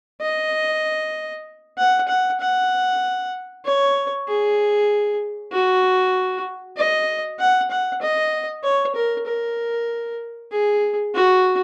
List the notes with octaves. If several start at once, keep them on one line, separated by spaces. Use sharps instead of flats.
D#5
F#5
F#5
F#5
C#5
G#4
F#4
D#5
F#5
F#5
D#5
C#5
A#4
A#4
G#4
F#4